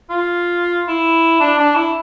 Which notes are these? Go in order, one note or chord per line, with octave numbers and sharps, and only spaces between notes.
F4
E4
D4
D4
E4